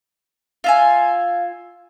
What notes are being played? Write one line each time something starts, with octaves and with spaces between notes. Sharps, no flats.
F4 E5 F5 G#5